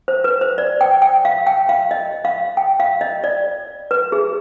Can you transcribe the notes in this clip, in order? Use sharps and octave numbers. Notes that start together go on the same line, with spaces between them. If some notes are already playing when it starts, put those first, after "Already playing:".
C5
B4
C5
D5
G5
G5
F5
G5
F5
D#5
F5
G5
F5
D#5
D5
B4
G#4